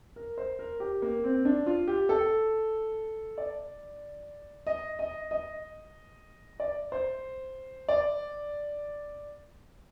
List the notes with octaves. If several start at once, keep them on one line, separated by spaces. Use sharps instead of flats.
A#4
C5
A#4
G4
A#3
C4
D4
F4
G4
A4
D5
D#5
D#5
D#5
D5
C5
D5